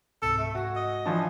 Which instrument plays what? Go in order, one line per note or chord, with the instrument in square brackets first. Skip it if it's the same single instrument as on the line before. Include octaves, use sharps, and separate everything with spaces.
[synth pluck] C#2 G#2 C3 [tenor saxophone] A4
[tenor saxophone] A3
[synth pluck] G#2 G#5 A#6 [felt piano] F#4
[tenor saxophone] D#5
[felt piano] E3 F3 D4 [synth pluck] C#6